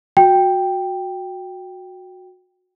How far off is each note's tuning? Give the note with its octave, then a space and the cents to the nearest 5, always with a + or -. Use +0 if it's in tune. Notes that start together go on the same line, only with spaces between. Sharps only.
F#4 -15 G5 +0